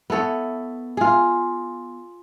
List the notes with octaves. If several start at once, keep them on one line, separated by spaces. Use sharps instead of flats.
B3 E4 A4 C#5
F4 G#4